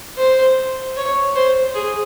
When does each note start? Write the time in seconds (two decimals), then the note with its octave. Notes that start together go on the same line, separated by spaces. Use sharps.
0.18 C5
0.96 C#5
1.35 C5
1.75 G#4